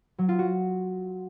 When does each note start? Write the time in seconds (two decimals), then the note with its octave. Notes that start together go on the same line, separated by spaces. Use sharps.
0.18 F#3
0.29 F4
0.39 F#4